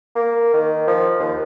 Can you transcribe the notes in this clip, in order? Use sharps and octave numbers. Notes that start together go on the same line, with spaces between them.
A#3
D#3
F3
D#2